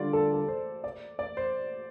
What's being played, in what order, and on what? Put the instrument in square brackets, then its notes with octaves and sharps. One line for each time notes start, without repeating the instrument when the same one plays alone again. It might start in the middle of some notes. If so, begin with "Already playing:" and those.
Already playing: [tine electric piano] D3 G3 F4 [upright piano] D5
[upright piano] A4
A4
C5
D5
D5
C5